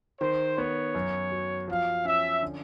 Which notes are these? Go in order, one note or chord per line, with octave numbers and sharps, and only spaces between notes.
D#3 C5
B3 C#5
F#2
F#3
F3 F5
C#4 E5
D3